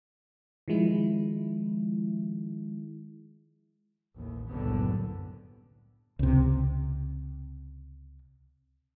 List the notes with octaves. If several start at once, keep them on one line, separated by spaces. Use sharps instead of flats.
D#3 F3 G#3 E4
A1 D#2 A2
F#1 C2 F#2 A2 D3 B3
C#2 C3